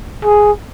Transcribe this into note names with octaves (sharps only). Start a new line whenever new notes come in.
G#4